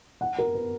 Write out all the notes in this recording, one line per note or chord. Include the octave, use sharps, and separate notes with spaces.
F#5
A#4
B4